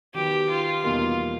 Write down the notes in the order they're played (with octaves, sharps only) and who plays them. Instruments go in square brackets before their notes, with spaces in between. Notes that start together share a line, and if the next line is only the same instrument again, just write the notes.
[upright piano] D#3 F#3 B3 [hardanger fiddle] G4
[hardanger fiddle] F4
[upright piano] E2 B2 G3 A#3 D#4 [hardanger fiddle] F4